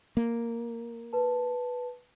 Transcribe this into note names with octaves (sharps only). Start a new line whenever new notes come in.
A#3
B4 A5